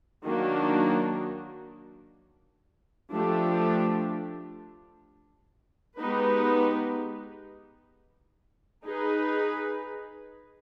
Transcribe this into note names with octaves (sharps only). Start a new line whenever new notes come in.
D#3 F#3 A#3 D4 F#4
F3 A3 D4 G4
G#3 B3 D#4 G4 B4
D#4 G#4 B4